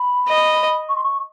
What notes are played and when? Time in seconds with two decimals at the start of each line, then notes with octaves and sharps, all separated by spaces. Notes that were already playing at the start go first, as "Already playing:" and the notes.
Already playing: B5
0.28 D#5
0.89 C#6
0.96 C6
1.03 C#6